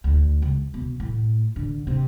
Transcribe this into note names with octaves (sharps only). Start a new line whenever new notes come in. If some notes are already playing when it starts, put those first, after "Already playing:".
D2
C#2
B2
A2
D3
C3